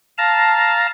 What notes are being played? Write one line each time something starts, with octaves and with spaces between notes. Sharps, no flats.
F5 A5 A#5